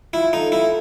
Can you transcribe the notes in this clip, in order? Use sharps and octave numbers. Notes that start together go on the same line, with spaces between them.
E4 F4
D#4 A4
C4 E4